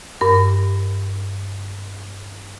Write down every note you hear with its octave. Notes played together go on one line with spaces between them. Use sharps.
G2 A#4